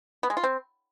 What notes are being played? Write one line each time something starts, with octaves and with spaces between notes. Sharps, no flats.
B3
G#3
F4
C4